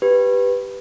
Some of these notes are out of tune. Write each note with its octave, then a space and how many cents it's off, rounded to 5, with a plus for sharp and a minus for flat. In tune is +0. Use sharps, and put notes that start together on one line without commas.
G4 +0 B4 +0